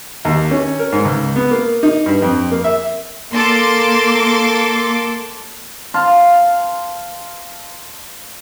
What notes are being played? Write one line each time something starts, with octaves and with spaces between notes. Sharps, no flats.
D#2
C#4
A#4
G#2
C#2
B3
A#3
D#4
G2
F2
A#3
E5
A#3 A4 C6 D6
F5 A5 C6